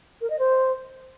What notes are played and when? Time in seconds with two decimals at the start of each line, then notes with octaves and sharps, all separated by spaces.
0.21 A#4
0.30 D#5
0.39 C5